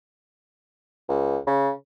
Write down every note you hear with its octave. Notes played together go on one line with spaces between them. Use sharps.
C#2
C#3